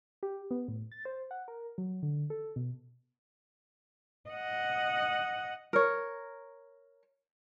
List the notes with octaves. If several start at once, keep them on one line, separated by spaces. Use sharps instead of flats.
G4
B3
A2
A6
C5
F#5
A#4
F#3
D3
A4
B2
D#5 F#5
A#4 C#5